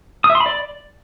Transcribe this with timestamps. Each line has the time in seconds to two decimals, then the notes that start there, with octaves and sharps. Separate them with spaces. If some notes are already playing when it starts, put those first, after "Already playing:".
0.24 D#6
0.30 E5
0.35 C6
0.40 B5
0.46 D5